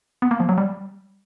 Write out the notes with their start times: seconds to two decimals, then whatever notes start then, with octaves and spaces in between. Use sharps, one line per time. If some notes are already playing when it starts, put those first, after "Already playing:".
0.22 B3
0.31 A#3
0.40 F3
0.49 F#3
0.58 G3